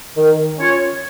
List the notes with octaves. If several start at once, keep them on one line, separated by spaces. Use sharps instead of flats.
D#3
C#4 F4 C#5